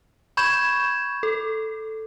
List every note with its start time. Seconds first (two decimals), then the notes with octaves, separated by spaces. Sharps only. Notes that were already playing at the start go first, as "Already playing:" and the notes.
0.37 B5 C#6 G6 G#6 E7
1.23 A4